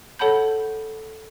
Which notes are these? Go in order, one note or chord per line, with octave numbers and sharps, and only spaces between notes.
A4 C#5 F#5 A5 B5 G6